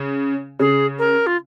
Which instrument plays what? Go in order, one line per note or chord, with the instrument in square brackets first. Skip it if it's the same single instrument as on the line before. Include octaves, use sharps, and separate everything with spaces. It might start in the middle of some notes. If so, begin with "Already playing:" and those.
Already playing: [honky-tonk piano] C#3
[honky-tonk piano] C#3 [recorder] G#4
[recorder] A#4
F4